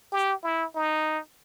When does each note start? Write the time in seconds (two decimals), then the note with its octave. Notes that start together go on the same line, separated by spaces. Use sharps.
0.12 G4
0.43 E4
0.75 D#4